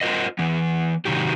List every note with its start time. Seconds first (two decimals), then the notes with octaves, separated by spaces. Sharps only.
0.01 F4 A#4 C5 D#5
0.39 E3 B3
1.05 C3 D#3 F#3 G4